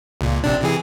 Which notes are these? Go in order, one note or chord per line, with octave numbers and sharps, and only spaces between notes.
C#2 A#2
A#1 C3 D4
C3 E3 G#4